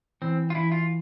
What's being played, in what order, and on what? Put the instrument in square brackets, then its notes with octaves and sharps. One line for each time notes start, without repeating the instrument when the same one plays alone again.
[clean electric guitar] E3 [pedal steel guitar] C4
[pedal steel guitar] F4
[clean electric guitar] E3 [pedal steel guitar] E4
[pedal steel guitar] F4